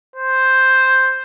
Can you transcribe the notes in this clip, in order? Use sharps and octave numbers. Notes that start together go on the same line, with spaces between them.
C5